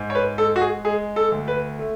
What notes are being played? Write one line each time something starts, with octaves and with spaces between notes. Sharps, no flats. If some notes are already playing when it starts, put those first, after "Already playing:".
Already playing: G#2
C#5
B4
G#3 A4
F#4
G#4
G#3 G#4
A4
D2
B4
A3